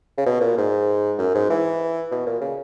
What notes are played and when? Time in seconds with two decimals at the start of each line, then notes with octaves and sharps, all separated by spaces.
0.18 C#3
0.26 B2
0.41 A#2
0.57 G#2
1.19 F#2
1.34 G#2
1.50 E3
2.11 B2
2.27 A#2
2.41 C#3